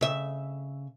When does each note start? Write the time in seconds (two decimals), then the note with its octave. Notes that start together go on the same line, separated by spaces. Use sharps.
0.01 C#3 E5